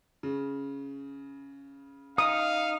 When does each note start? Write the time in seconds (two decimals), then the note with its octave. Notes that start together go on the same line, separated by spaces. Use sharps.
0.23 C#3
2.18 D#4 F5 D#6